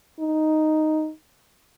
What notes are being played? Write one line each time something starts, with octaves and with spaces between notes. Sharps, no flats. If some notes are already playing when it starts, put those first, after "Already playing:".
D#4